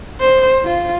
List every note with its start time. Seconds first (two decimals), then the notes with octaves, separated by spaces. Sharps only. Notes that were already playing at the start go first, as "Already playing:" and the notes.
0.20 C5
0.65 F4